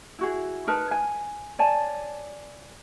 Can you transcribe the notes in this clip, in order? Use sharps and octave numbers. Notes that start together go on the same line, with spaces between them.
E4 F#4 G#4
D#4 A#4 B4 A5
G#5
C#5 D5 G#5 A5